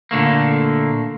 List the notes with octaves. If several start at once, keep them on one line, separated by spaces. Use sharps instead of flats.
A#2 D3 A3 A#3